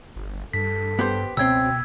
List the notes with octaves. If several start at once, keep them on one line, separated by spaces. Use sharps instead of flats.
G1
G2 A4 B6
B3 G4 C5
C#2 B2 C4 G5 E6 G#6